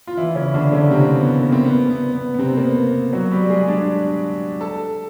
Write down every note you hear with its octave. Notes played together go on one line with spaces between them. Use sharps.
F4
E3 E4
C#3 C#4
D3 D4
C#3 C#4
C3 C4
B3
A#3
C4
B3
B3
B3
B3
C3 C4
A#3
B3
F#3 F#4
G3 G4
G#3 G#4
D4 D5
A4 A5